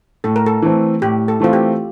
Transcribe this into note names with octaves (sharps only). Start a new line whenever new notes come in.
A2 A4
A#4
A4
E3 A3 C4
A2 G4
A4
E3 A3 C4 F4
G4